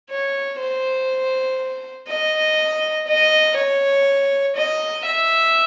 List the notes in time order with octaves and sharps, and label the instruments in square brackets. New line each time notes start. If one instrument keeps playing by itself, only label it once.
[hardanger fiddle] C#5
C5
D#5
D#5
C#5
D#5
E5